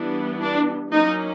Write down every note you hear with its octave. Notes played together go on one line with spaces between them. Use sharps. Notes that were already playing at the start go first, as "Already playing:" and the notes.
Already playing: E3 G3 B3 D4
D4
F#3 A#3 C#4 D#4